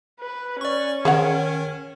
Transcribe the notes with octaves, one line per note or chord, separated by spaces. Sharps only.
B4
C#4 D5 C#6
D#3 G#4 C#5 F#5